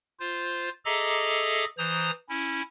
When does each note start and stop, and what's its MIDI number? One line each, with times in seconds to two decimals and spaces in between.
0.20 0.69 65
0.20 0.69 72
0.85 1.65 68
0.85 1.65 69
0.85 1.65 75
0.85 1.65 76
0.85 1.65 82
0.85 1.65 86
1.78 2.11 52
1.78 2.11 72
1.78 2.11 82
1.78 2.11 87
2.29 2.62 61
2.29 2.62 64